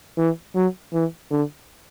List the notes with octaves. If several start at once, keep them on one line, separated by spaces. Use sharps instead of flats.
E3
F#3
E3
D3